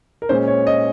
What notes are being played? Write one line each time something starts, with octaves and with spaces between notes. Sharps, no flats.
A#4
A#2 G#3 C#4 C5
C#5
D#5